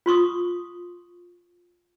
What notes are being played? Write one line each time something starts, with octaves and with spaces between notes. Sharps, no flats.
F4 C6 C#6 D#6